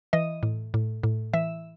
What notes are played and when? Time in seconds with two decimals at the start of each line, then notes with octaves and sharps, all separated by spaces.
0.13 E3 D#5
0.43 A2
0.74 A2
1.03 A2
1.34 E3 E5